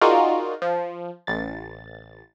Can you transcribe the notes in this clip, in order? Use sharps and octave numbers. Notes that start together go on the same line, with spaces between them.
D#4 F4 F#4 G#4 A#4 D5
F3
A1 A6